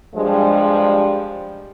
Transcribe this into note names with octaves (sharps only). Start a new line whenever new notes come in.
G2 F3 G3 G#3